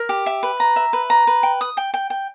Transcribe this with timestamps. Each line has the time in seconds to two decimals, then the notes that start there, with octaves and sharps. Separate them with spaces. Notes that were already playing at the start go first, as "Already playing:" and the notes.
Already playing: A#4
0.09 G4
0.26 E5
0.43 B4
0.60 A#5
0.76 E5
0.93 B4
1.10 A#5
1.27 B4
1.43 G5
1.61 D#6
1.77 G5
1.94 G5
2.10 G5